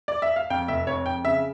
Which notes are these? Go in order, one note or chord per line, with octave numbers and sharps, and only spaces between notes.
D5
E5
F5
F2 G5
F1 E5
F2 C#5
F2 G5
C#3 E5